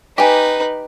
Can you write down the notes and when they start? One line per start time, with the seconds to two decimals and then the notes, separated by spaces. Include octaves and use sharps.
0.18 D#4 G4 B4 G#5